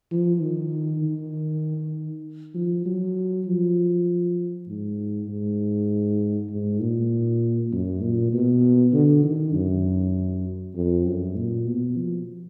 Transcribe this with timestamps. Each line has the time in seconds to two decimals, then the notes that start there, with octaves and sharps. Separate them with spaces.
0.12 F3
0.41 D#3
1.03 D#3
2.55 F3
2.86 F#3
3.46 F3
4.67 G#2
5.28 G#2
6.50 G#2
6.80 A#2
7.72 F#2
8.01 A#2
8.33 B2
8.93 D3
9.24 D#3
9.54 F#2
10.75 F2
11.05 F#2
11.36 A#2
11.66 B2
11.96 F3